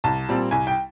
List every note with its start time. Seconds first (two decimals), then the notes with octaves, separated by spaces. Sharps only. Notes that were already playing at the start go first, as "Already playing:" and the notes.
0.04 C2 A5
0.29 A#2 G3 C4
0.51 C2 G#5
0.67 G5